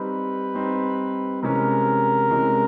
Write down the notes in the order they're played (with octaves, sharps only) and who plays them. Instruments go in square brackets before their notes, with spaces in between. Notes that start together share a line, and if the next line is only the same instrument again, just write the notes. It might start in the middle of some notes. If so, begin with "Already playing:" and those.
Already playing: [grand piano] G3 C4 D#4 [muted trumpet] B4
[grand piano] G3 C4 D#4
[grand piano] C3 E3 G#3 C#4 [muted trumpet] A#4
[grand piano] C3 E3 G#3 C#4